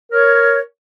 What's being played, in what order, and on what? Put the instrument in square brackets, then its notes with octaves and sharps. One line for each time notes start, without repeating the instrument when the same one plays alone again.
[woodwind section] A#4 C#5